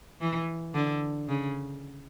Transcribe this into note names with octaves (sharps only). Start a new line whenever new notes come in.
E3
D3
C#3